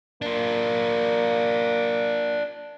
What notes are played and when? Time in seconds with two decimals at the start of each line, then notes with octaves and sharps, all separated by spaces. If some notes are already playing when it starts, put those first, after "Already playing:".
0.22 A#3 D4 F4